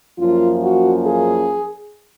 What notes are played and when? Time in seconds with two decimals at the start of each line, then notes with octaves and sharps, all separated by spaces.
0.19 F#2 F3 A#3 C#4 F4
0.62 F#4
1.05 G#4